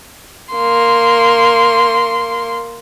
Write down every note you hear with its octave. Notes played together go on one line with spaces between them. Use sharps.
A#3 C6